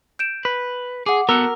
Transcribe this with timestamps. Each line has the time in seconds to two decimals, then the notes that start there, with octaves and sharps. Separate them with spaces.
0.19 G6 D7 E7
0.45 B4
1.06 G#4 F#5 D6
1.29 B3 F#4 A4 A#4 E6